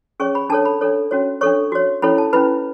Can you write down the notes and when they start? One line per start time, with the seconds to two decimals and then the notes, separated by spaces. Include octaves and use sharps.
0.20 C#4 G#4 C#5 C#6
0.35 B5
0.50 D4 A4 C#5 A5
0.65 B5
0.81 D4 A4 C#5
1.11 C#4 F#4 C#5
1.41 D4 A4 C#5 C#6
1.72 F#4 C#5
2.02 C#4 E4 A4 C#5 B5
2.18 A5
2.33 C#4 E4 B4 B5